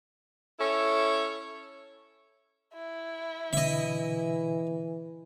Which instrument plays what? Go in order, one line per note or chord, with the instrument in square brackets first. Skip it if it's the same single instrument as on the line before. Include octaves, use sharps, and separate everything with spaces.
[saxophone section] C#4 E4 A4 C#5
[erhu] E4
[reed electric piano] B2 D3 [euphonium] E3 [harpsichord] D#5 E5